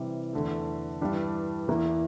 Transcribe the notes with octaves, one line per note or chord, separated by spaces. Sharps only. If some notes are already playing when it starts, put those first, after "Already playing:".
Already playing: C3 E3 G3 C4
E2 D3 A3
G2 E3 G3 D4
E2 E3 A#3 E4